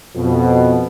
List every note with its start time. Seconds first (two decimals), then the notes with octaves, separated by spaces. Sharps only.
0.15 F2 B2